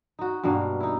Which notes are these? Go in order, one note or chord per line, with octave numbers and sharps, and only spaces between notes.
D#4 F#4
G2 B2 A#3 D4
D#4 E4